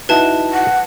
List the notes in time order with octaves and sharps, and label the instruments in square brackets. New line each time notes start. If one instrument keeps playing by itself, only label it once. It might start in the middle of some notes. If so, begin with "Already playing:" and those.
[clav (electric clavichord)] D#4 E4 F#4 [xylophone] B4 A5
[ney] F#5